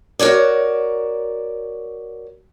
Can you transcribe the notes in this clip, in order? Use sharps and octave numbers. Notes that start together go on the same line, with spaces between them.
F#4 A#4 C#5 D5